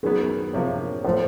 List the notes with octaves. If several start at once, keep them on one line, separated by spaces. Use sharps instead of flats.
F#2 D#3 F#3 B3 G#4
C3 F3 A#3 C#5
A2 F3 A3 C5